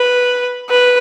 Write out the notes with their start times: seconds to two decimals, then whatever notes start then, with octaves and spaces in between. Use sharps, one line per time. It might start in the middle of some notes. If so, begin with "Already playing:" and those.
Already playing: B4
0.70 B4